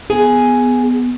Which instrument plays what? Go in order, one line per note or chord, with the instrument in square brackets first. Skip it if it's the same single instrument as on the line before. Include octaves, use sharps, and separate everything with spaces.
[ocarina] B3 [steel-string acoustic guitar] G#4 G#5